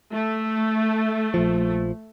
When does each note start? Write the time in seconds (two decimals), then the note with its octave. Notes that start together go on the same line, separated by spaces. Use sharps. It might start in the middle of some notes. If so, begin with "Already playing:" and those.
0.14 A3
1.34 A#1 F3